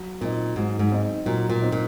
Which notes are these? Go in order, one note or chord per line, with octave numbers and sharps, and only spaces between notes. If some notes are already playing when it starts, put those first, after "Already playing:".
Already playing: F#3
A#2 C4 D#4
G#2 F#3
G#2
C4 D#4
A#2 F#3
A#2
C4 D#4
A#2